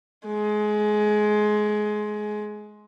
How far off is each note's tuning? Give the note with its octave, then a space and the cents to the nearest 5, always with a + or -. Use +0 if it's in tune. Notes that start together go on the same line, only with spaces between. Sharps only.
G#3 +20